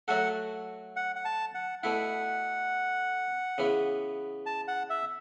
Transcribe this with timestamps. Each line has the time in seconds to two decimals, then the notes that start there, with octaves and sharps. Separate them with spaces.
0.08 F#3 A3 F#4 A4 F#5
0.96 F#5
1.16 F#5
1.25 A5
1.54 F#5
1.83 B2 A3 E4 F#5
3.58 C#3 E3 B3
4.46 A5
4.68 F#5
4.90 E5